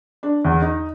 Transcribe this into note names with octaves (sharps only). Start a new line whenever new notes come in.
D4
E2
D#4